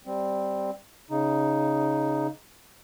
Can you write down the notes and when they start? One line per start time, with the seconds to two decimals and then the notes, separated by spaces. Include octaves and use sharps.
0.06 G3 C4
1.10 C#3 D#4